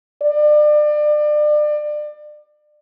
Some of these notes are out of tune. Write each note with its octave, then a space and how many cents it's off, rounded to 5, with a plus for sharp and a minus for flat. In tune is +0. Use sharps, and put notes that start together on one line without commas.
D5 +30